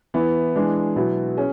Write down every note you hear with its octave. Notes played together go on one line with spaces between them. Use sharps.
E3 B3 E4
E3 G#3 D4
B2 F#3 B3 E4
C#4 G#4